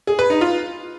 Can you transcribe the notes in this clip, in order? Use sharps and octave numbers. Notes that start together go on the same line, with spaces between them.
G#4
B4
D#4
F4